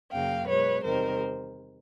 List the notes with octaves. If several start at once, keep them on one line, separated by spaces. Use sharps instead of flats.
F#2 C#3 F#3 A#3 F5 G5
B2 G#3 B4 C#5
E2 C3 D#3 G3 A#4 C5